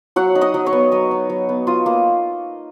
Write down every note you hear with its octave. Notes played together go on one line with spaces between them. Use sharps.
F#3 F#4 F#5
D#4
D#5 D#6
F#3
C#5 C#6
B3
F#3 D#5 D#6
D#4
F#3
B3
F4 D#5 D#6
A#3